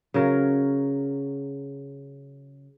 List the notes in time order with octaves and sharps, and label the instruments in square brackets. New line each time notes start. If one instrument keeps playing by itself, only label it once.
[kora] C#3 F#3 A#4